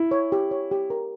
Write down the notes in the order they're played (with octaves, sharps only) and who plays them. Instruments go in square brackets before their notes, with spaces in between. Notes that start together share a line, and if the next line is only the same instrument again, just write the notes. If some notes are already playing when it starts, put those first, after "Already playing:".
Already playing: [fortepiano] E4
[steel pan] C#5
G4
C#5
G4
A#4